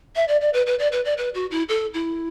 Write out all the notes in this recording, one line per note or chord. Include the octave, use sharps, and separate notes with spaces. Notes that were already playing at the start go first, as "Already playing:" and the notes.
E5
D5
D5
B4
B4
D5
B4
D5
B4
F#4
E4
A4
E4